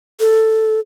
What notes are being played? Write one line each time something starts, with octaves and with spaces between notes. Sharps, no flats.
A4